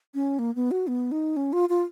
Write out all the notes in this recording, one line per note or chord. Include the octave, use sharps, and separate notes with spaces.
C#4
A#3
B3
F#4
B3
D#4
C#4
F4
F4